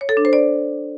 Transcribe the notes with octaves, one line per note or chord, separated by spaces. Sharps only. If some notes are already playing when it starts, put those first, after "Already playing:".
C#5
A4
D4
C5
D5